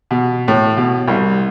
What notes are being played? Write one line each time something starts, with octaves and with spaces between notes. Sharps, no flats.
B2
A2
B2
C2